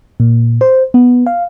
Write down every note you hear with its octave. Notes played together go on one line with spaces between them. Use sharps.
A#2
C5
B3
F5